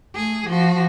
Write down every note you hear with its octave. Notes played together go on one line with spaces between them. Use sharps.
A3 G#4
F3 F#4